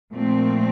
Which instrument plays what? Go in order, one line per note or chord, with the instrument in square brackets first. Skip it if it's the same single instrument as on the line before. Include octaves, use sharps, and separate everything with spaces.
[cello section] A#2 F3 A3 C4